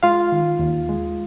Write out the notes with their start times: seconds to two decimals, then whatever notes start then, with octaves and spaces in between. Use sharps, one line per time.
0.03 G#3 F4 F5
0.32 D#3
0.59 D#2
0.89 G#3